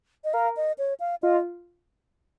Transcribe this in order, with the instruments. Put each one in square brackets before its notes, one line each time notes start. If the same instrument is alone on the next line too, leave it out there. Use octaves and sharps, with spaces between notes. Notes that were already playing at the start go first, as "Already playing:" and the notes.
[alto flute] D#5
[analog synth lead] A#4 [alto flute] F5
[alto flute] D#5
C#5
F5
[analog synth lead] F4 [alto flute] D#5